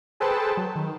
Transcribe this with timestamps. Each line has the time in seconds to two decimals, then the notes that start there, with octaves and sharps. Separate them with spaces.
0.20 G#4 A4 B4 C5 G5 A5
0.57 F#3
0.76 D#3